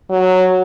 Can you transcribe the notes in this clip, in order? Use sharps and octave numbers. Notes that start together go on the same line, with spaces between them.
F#3